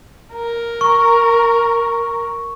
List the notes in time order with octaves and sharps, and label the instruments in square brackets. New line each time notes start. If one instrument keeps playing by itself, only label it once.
[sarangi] A#4
[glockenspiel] C#6